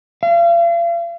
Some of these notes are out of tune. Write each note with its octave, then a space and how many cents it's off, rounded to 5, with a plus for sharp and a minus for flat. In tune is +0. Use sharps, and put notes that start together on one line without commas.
F5 -40